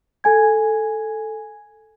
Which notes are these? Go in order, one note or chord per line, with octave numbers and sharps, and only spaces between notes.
A4 G#5 G#6